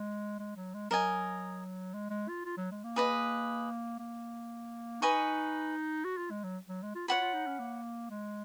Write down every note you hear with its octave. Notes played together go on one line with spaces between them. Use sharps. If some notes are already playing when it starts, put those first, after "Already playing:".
Already playing: G#3
G#3
F#3
G#3
F#3 A#4 D#5 G#5
G#3
G#3
F4
F4
F#3
G#3
A#3
G#4 B4 D#5
A#3
D#4 B4 D#5 G#5 C#6
F#4
F4
G#3
F#3
F#3
G#3
F4
F4 C#5 F#5 B5
F4
D#4
C#4
A#3
G#3